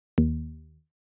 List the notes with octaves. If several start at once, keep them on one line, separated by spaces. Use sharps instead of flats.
D#2